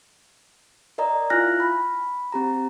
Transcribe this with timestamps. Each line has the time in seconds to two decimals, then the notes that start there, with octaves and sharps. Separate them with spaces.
0.98 A#4 D5 D#5 A#5
1.30 E4 F4 G#5 F6 F#6 A#6
1.60 B5
2.32 C4 G4 A#5